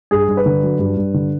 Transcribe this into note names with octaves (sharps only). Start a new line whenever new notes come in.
G2 G#4
G2
B4
D3
F#3
G2
G2
D3